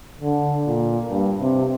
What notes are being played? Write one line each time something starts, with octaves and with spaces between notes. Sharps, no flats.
D3
A#2
G2
C3